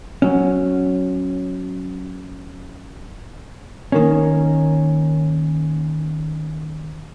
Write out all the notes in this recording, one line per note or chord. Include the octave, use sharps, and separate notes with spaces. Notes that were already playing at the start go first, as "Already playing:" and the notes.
F#3 C#4
D#3 A#3 C#4